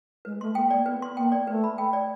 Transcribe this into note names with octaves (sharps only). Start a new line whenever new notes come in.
G#3 B4
A3 C6
A#3 G5
A#3 D5
B3 B4
C6
A#3 G5
D5
A3 B4
B5
G5
D5